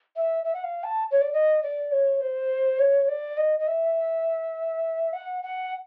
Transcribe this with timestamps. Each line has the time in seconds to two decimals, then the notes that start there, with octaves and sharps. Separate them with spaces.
0.16 E5
0.44 E5
0.54 F#5
0.64 F5
0.84 A5
1.11 C#5
1.21 D5
1.33 D#5
1.62 D5
1.92 C#5
2.21 C5
2.79 C#5
3.08 D5
3.37 D#5
3.60 D#5
3.67 E5
5.13 F#5
5.43 F#5